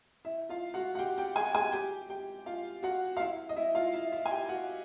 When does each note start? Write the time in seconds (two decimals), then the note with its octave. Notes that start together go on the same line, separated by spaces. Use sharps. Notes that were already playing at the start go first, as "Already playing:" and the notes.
0.25 E4 E5
0.49 F4 F5
0.74 F#4 F#5
0.95 F#5
0.99 G4 G5
1.18 G4 G5
1.36 G#4 G#5
1.55 G#4 G#5
1.72 G4 G5
2.09 G4 G5
2.46 F4 F5
2.83 F#4 F#5
3.17 F5
3.20 E4 E5
3.49 D#5
3.56 E4 E5
3.75 F4 F5
3.93 E4 E5
4.12 E4 E5
4.26 G#5
4.30 G4 G5
4.49 F#4 F#5